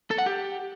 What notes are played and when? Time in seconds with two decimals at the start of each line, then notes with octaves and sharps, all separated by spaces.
0.11 A4
0.18 F#5
0.26 G4